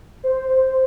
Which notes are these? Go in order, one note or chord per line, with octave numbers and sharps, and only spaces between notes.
C5